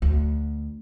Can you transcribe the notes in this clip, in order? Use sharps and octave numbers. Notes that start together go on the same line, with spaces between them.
D2